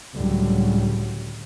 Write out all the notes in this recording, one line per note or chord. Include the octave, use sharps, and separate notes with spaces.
C#2 A2 D3 F#3 G3